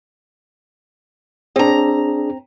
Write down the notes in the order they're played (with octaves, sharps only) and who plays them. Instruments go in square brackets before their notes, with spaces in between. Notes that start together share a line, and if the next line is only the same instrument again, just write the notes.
[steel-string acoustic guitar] C4 A#5 [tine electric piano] D4 G#4